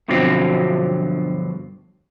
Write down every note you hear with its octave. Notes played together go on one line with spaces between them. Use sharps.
G2 B2 D3 F3 F#3 C4